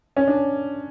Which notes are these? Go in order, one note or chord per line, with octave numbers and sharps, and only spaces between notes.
C#4
D4